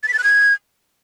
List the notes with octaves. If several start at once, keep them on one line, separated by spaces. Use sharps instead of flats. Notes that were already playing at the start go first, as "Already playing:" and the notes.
A6
B6
A6
F#6
G#6